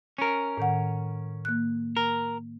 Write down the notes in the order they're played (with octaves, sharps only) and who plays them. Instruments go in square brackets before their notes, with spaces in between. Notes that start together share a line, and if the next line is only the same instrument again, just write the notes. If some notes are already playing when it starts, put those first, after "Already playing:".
[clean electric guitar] C#4 A#4
[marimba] A2 D#3 F#5
A#3 F#6
[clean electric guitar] A#4